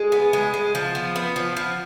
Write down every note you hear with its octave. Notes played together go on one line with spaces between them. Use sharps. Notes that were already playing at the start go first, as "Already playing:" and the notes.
Already playing: G#3
B3
G#3
G#3
F3
B3
B3
F3
F3